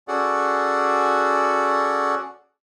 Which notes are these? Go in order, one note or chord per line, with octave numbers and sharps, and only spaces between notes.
C#4 F#4 G#4 A4 D5 F#5